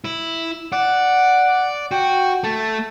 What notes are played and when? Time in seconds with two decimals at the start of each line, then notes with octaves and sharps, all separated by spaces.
0.05 E4
0.73 D5 F#5
1.91 F#4 G5
2.44 A3 A5